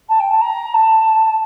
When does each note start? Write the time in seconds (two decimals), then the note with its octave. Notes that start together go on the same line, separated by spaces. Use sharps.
0.09 A5
0.19 G5
0.30 A5
0.41 A#5
0.74 A5